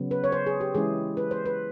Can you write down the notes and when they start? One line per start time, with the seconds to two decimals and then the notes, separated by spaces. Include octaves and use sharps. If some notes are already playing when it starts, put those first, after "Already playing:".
Already playing: C#3 F#3 B3
0.11 B4
0.24 C#5
0.32 C5
0.46 G#4
0.60 G4
0.75 E3 G#3 C#4 E4 G#4
1.17 B4
1.31 C5
1.46 B4